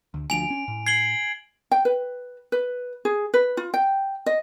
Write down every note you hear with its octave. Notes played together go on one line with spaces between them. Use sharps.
D2
D2 F3 G#5 D7 F7
C#4
A2
G#6 C7 F#7 G7
G5
B4
B4
G#4
B4
F4
G5
D#5